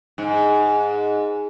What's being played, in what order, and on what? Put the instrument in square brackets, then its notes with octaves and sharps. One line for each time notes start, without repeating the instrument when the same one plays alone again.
[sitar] G#2